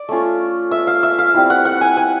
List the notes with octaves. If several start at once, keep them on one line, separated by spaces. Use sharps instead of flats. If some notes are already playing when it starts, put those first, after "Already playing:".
Already playing: D5
A3 C#4 F4
E5
F5
E5
F5
G3 C4 E4
F#5
F#5
G#5
G#5